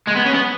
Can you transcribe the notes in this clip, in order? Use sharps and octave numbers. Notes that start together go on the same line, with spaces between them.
G#3
B3
C#4
B3